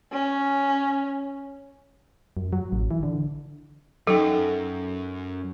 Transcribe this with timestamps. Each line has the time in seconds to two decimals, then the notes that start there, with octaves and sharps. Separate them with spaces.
0.12 C#4
2.37 F#2
2.53 F#3
2.72 A1
2.91 E3
3.03 D3
4.07 F#2 F#3 D#4 A4 G5